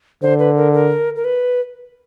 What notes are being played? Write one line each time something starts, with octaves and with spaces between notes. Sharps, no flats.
D3 C5
B4
A#4
A#4
A#4
B4